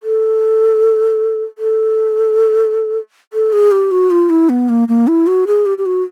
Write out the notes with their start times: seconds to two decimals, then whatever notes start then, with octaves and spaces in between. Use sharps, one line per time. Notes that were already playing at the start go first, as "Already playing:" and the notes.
0.03 A4
1.58 A4
3.33 A4
3.53 G#4
3.72 G4
3.91 F#4
4.11 F4
4.30 E4
4.49 B3
4.69 A#3
4.88 A#3
5.08 E4
5.27 F#4
5.47 G#4
5.66 G4
5.78 G4
5.86 F#4